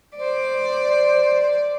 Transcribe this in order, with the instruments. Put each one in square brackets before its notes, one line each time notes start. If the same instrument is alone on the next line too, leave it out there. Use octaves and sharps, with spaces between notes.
[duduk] C5 [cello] D5